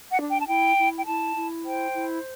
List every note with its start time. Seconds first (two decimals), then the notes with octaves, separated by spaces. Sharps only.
0.10 F#5
0.19 D4
0.29 G5
0.39 A5
0.48 E4 G5
0.77 E4
0.99 G5
1.06 E4 A5
1.35 E4
1.65 C5 G5
1.94 E4